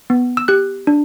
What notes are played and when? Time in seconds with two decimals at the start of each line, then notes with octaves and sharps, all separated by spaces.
0.10 B3
0.37 E6
0.48 G4 F#6
0.87 D4